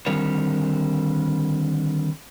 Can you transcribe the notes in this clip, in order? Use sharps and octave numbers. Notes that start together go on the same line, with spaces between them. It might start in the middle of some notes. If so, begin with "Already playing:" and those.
D3 D#3 G3 C4 A#4 C#5